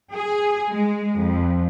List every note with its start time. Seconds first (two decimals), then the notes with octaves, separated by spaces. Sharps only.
0.15 G#4
0.69 G#3
1.18 F2